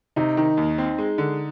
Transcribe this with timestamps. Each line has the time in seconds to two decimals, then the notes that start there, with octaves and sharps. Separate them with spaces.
0.16 C3 D#4
0.37 D#3
0.57 D#2
0.78 C4
0.98 G#3
1.18 D3